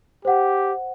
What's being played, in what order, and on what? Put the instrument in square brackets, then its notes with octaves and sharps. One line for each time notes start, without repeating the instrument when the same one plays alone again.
[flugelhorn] G4 [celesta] C5 F#5